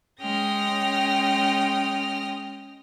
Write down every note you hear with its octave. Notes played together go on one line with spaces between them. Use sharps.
G#3 C#4 G5 D#6 F6 A#6